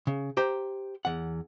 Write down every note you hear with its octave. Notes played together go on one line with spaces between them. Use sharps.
C#3
G4 C5 A#5
E2 F#5